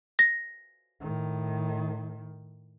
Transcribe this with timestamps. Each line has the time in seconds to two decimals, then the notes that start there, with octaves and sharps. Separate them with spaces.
0.19 A#6
1.00 A2 D#3